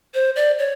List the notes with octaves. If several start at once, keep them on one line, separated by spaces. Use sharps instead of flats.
C5
D5
C#5